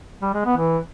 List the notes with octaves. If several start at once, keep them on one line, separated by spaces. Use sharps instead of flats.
G3
G#3
B3
E3